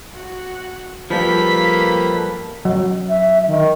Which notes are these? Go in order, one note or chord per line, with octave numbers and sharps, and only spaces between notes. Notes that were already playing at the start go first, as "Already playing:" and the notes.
F#4
F3 G3 A#3 A4 B4 B6
F#3
E5
D#3